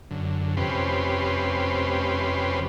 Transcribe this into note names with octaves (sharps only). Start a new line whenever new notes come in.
F#2 D3
F2 C3 C#4 G4 B4 C6